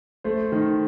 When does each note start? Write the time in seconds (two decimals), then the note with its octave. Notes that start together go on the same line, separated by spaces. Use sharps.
0.24 A3 C5
0.52 D#3